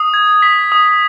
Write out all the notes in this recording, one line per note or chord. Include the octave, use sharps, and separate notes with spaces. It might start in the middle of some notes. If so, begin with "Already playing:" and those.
Already playing: D#6
G#6
B6
D#6